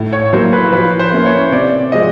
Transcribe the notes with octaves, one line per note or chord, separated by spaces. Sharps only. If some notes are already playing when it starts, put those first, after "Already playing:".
Already playing: A2
C#5
F#3 A#3 C5
B4
F3 B4
C5
A#3 C#4 E4
C#5
C3 D5
F3 G#3 C4 D#5